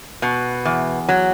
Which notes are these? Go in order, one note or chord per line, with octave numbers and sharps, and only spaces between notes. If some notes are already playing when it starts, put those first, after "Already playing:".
B2
E2
F#3